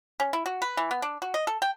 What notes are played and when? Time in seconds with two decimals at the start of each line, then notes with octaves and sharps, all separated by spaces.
0.20 C#4
0.33 E4
0.46 F#4
0.62 B4
0.77 E3
0.91 B3
1.02 D4
1.22 F#4
1.34 D#5
1.47 A4
1.62 G5